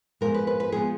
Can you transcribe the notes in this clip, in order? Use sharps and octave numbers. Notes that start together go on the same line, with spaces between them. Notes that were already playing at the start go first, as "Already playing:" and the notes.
A#2 F3 G#3 B3 A#4
B4
B4
B4
A#2 F3 G#3 B3 G#4